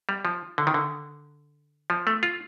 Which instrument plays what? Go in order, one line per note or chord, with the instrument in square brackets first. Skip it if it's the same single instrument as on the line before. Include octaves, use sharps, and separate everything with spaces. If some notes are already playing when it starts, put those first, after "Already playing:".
[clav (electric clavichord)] G3
F3
D3
D#3
D3
F3
A3
F4